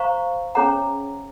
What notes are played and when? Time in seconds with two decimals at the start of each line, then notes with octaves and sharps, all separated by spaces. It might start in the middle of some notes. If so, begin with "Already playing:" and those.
Already playing: C5 F5 A#5 C#6
0.55 C#4 G#4 C#5 F#5 A#5